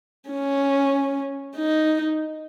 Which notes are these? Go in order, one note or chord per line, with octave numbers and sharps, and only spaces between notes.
C#4
D#4